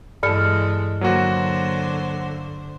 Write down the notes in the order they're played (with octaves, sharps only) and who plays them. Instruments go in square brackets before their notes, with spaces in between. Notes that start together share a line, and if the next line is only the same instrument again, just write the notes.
[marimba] G2 [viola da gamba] E3 G#3 [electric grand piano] A4 A5 [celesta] D5 F6 C#7
[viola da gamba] D3 C5 [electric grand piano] F#3 A#3 F#4